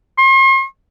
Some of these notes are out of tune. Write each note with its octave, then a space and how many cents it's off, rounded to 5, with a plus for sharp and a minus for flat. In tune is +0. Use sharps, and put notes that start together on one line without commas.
C6 +45